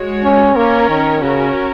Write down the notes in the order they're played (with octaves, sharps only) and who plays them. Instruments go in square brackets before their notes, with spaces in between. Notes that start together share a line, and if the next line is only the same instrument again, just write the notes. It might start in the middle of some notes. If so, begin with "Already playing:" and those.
Already playing: [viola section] G#3 F#4 C#5
[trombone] C#4
[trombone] A#3 [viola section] C#4 A#4 C#5
[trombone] D#3
[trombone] C#3 [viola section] C#4 F#4 A#4